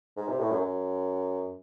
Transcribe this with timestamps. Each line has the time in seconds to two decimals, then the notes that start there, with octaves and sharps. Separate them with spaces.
0.16 G#2
0.28 C3
0.39 A2
0.50 F#2
0.61 F#2